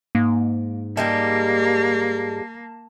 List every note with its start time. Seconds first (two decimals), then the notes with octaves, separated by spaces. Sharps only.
0.15 G#2 A#3
0.97 G3 G#3 A#3 G4 A5